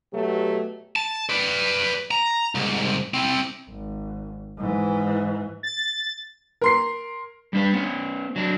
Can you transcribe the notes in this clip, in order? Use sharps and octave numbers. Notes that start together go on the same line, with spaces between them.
B2 F#3 A3 G4
A5
B4 D5
A#5
C2 G#2
C4 E4
G#1
G#2 E3
A6
A#4 C6 C7
G3 D4 B4
B3 C#4
F#3 D4